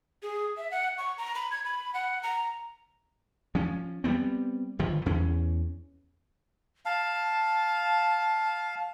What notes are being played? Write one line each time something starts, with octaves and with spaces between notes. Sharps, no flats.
G#4
E5
F#5
C#6
A#5
B5
G#6
B5
F#5
A#5
F3 C#4
G3 A3 B3 C4
G1 D#3 F3
E2 C#4
F5 A5